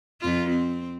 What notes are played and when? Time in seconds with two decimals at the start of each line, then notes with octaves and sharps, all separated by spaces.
0.21 F2 F4
0.50 C4